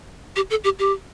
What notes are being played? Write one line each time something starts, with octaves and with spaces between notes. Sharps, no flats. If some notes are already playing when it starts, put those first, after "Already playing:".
G4
A4
G4
G4